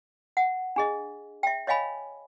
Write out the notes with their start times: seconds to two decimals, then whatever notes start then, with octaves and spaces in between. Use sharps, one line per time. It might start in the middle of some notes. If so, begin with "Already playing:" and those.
0.37 F#5
0.76 D4 G#4 D#5
1.43 E5 G5
1.67 C#5 D#5 F5 G#5 B5